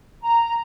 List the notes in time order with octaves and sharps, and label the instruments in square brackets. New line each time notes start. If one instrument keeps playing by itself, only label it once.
[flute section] A#5